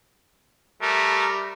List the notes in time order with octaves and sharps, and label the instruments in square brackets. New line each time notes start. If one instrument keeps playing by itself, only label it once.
[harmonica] G3 [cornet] A3 [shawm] A#4